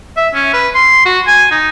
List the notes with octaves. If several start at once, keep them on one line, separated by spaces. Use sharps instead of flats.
E5
C#4
B4
C6
F#4
G#5
D#4